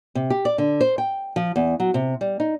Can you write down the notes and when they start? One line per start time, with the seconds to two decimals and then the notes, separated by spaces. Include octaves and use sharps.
0.15 C3
0.30 G4
0.45 D5
0.58 D3
0.81 C5
0.98 G5
1.36 F3
1.56 E2
1.80 F#3
1.94 C3
2.21 G3
2.40 D#4